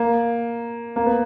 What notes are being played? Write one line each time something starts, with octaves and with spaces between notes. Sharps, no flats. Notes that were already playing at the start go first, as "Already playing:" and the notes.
Already playing: A#3
A#3
B3